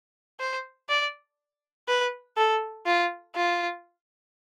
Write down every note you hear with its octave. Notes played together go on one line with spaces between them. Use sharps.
C5
D5
B4
A4
F4
F4